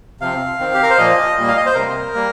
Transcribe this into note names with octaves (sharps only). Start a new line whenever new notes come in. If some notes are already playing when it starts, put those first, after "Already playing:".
C3 F3 C4 F5
D#3 C4
G4
A#4
C5
A#2 F3 A#3 D#5
A#2 G3 A#3
F5
D#5
C5
C3 G3 A#3 A#4
G3 A#3